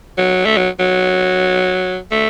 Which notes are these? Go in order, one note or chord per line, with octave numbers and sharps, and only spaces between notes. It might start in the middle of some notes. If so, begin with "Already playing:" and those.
F#3
A3
F#3
F#3
A3